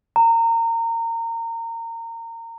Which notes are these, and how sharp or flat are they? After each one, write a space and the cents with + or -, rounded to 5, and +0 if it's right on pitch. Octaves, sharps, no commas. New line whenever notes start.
A#5 -25